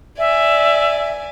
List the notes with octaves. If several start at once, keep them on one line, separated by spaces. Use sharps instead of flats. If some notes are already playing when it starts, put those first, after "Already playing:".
D5 E5 G#5